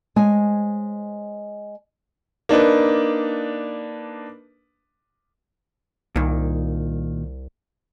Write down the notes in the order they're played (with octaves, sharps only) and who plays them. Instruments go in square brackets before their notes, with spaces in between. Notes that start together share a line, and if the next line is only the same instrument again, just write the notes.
[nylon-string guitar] G#3 C5 C#5 G#5
[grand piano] A#3 D4 D#4 B4
[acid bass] C2 [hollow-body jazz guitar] A#2 D#3